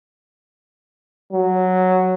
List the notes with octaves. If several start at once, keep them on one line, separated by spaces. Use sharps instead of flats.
F#3